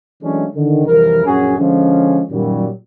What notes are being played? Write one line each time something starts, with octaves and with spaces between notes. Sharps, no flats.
E3 F#3 G#3 A3 C#4 D4
D3 D#3
C2 F2 E3 A#4
A#1 F#2 C#4 F#4 G#4
D3 F3 G#3 C#4
F#2 A#2 D#3 F#3 G3